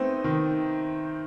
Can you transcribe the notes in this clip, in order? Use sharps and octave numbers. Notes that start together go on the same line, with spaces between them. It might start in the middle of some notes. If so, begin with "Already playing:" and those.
Already playing: A3 B3 C4 D#4
D#3